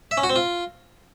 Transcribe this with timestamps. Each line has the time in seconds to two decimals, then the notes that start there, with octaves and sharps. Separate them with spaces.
0.11 E5
0.17 C#4
0.23 F#4
0.30 C4
0.36 F4